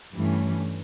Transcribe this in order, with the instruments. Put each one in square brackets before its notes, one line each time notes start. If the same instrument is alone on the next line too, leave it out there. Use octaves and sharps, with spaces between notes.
[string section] G2 E3 A3 C#4